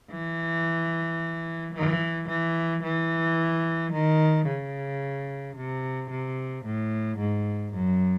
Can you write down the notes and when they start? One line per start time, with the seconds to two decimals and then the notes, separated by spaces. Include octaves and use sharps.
0.11 E3
1.75 E3
2.29 E3
2.84 E3
3.93 D#3
4.47 C#3
5.56 C3
6.11 C3
6.65 A2
7.19 G#2
7.74 F#2